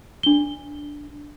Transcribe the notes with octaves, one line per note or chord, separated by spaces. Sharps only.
D4 G7